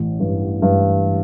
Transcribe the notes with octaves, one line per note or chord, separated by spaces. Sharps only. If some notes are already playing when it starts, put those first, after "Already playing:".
Already playing: A1
G2
G2